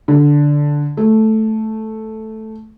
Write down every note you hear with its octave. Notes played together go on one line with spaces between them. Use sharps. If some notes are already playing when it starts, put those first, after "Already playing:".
D3
A3